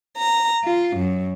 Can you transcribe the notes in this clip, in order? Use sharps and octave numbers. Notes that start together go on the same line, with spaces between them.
A#5
F4
F#2